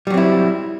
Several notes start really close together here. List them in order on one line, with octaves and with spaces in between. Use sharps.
G3 F#3 C4 E4